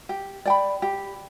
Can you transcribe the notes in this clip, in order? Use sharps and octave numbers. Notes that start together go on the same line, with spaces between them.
G4
D5 G5 B5
G4